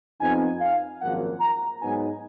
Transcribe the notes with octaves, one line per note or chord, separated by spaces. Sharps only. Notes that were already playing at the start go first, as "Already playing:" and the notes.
F2 F3 B3 D#4 G#5
F5
G#1 F#2 F3 A#3 F#5
A#5
G#2 F#3 B3 D#4 G#5